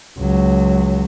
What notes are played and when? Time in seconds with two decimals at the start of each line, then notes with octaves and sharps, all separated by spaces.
0.18 C#2 F#3